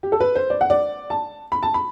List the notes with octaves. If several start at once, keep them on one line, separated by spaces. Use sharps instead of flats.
G4
A4
B4
C5
D5
F#5
D5
A5
B5
A5
B5